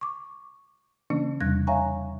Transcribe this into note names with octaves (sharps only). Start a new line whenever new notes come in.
C#6 D6
C#3 E3 A#3 C#4 D4
E2 C3 G3 F#6 G#6 A#6
C#5 E5 F5 G#5 A#5 C#6